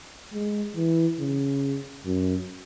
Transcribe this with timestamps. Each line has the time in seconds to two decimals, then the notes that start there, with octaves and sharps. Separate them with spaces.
0.33 G#3
0.76 E3
1.19 C#3
2.05 F#2